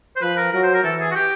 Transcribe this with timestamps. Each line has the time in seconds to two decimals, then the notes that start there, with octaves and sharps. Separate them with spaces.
0.16 C5
0.22 F3 B4
0.37 A#4
0.52 F#3 A#4
0.63 C5
0.74 A#4
0.84 E3 A4
1.00 G#4
1.11 F#4
1.15 G4